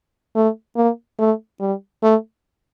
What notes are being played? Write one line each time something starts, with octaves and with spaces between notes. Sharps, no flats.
A3
A#3
A3
G3
A3